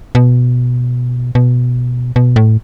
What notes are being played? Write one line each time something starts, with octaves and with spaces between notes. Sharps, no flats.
B2
B2
B2
A2